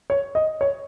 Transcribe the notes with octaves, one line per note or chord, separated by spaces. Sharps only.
C#5
D#5
C#5